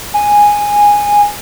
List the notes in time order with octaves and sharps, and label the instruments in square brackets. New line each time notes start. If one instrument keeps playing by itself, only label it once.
[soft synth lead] G#5